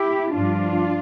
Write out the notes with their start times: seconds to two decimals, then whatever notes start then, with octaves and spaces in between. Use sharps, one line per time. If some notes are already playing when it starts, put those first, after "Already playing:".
Already playing: E4 G4
0.34 G2 F3 D4 F4